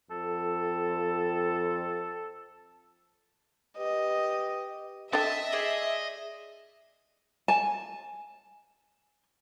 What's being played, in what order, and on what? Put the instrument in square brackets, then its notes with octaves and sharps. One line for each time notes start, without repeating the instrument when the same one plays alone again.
[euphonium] F2 [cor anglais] A4
[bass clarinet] G4 [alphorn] B4 [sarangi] D#5
[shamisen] D4 A4 G5 [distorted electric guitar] D#5 [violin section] E5 [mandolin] A5
[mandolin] G#4 C5 D5
[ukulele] G#5 A5